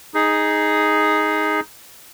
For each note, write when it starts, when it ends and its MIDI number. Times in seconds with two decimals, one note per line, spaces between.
0.14 1.60 63
0.14 1.60 68